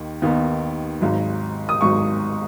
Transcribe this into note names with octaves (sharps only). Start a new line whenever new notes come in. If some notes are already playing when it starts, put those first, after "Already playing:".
Already playing: D#2 D#3
D#2 D#3 B3
G#1 G#2 F#3
D#6
G#1 G#2 F#3 C#6